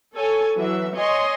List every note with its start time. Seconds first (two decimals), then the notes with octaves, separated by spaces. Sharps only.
0.13 A4 C#5 G#5
0.56 E3 F#3 E5
0.95 C#5 D#5 G#5 C6